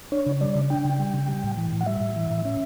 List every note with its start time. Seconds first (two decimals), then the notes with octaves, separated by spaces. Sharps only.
0.12 D4 C#5
0.26 C#3
0.41 G3 D5
0.55 C#3
0.70 D4 G5
0.85 C#3
0.99 G3
1.14 C#3
1.28 G3
1.43 A2
1.57 E3
1.72 A2
1.81 F#5
1.86 G3 E5
2.01 A2
2.16 E3
2.31 A2
2.45 C#4